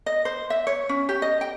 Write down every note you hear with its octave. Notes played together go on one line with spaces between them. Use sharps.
D#5
C5
E5
C#5
C#4
G4
D#5
G5